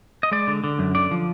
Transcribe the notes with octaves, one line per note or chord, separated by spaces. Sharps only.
D#5
G#3 D5
D3
D3
F#2
D3 D5
F3